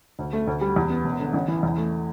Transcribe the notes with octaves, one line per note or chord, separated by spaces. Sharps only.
D2
A3
D2
G3
E2
B3
E1
D3
A1
E3
E2
A3